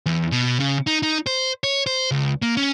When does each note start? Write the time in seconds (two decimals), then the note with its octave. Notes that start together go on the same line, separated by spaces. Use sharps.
0.06 E2
0.32 B2
0.60 C#3
0.87 D#4
1.03 D#4
1.26 C5
1.64 C#5
1.86 C5
2.11 C#2
2.42 A#3
2.57 C#4